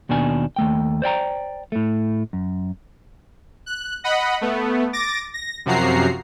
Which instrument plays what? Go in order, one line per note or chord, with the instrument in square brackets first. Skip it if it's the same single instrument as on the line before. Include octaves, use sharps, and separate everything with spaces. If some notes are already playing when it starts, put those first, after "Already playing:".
[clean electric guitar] D#2 B2 D#3 D4 G#5
D#2 A3 G5
C5 D5 G5 A#5
A2 A3
F#2
[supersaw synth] F#6
D#5 F#5 B5
A3 B3
D6 A6 A#6
A#6
F#2 C3 F3 F#4 A#5 C7